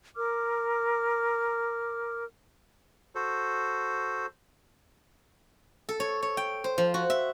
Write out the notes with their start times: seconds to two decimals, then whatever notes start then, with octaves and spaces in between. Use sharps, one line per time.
0.16 A#4 D6 F6
3.15 F#4 A4 C5
5.89 A4
6.00 C#5
6.23 C#5
6.37 G5
6.64 C5
6.78 F3
6.94 F#4
7.10 E5